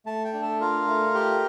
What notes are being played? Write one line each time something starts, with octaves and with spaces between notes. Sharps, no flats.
A3 A5
G5
D4
A4
F4 A#4
A3
G4